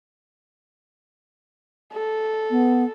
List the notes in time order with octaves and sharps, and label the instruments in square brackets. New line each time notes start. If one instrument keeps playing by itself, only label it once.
[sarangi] A4
[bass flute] B3